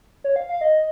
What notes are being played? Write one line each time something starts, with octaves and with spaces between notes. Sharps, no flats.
C#5
F5
F5
D#5